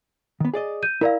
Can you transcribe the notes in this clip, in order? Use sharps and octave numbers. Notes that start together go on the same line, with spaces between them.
D#3 B3
G#4 D5 D#5
G6 D#7
E4 A#4 D5 F5 A#5